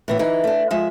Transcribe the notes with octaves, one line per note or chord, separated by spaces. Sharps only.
A2 E3 B3
E3 D#4
A3 D4
F3 G#3 E5